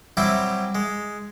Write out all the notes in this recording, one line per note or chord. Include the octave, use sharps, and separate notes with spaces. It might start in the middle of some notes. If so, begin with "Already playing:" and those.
F#3 G3 C4 E4 F#4 G4
G#3